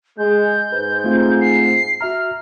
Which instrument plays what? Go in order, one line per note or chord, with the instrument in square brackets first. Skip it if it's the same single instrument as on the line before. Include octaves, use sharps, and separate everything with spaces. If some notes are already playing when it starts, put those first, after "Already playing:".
[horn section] G#3 [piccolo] G6
[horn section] G#2 [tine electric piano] B4
[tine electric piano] A3 C4 F4
[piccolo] C7
[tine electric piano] F#4 E5 A#5 [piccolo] F6